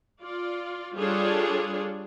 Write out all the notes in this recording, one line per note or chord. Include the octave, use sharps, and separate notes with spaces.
F4 D5
G3 D4 F4 G#4 A4 C#5